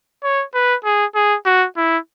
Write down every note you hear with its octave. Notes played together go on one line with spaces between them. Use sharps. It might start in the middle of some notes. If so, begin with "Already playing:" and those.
C#5
B4
G#4
G#4
F#4
E4